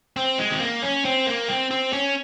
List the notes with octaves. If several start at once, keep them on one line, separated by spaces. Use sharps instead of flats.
C4
G#3
C4
A#3
C#4
C4
A#3
C4
C4
C#4